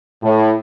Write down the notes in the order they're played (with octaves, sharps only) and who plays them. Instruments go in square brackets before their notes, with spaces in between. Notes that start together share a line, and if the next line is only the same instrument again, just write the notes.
[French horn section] A2